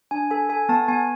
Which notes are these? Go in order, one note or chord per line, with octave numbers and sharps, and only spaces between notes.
D4 G#5
A4 G#5
A4 G#5
B3 A5
B3 G#5